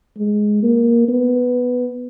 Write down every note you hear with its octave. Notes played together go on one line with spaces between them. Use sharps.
G#3
A#3
B3